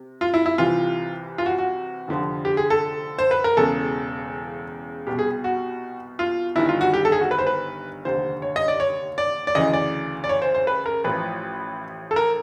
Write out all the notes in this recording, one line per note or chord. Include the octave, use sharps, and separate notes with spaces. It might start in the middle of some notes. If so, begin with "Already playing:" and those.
Already playing: C3
F4
E4
E4
C2 C3 E3 F4
F4
F#4
F#4
F1 F2 D3 F3
G4
G#4
A4
C5
B4
A#4
E1 E2 C#3 A4
C2 B2 G4
G#4
F#4
F4
G1 G2 D#3 E4
F4
F#4
G4
A4
G#4
F#4
B4
C5
B4
F1 D#2 D3 C5
C#5
D#5
D5
C#5
D5
D5
D2 C#3 E3 D#5
D5
D5
C#5
C5
C5
B4
A#4
A1 A2 F3 B4
A4
A#4